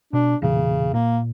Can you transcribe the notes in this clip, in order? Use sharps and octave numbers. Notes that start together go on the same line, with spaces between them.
B2 D4
E1 A#2 C#3 E3
A#2 A#3